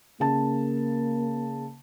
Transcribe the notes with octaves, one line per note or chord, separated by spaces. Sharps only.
C#3 A#3 A5